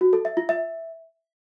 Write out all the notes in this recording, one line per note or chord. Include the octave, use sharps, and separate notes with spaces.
F#4
A4
E5
F4
E5